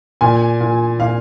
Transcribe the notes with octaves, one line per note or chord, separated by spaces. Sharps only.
A#2 G#5
A#2
A#2 F5